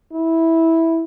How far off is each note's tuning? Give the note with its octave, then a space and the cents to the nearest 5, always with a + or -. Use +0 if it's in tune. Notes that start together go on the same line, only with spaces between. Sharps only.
E4 -10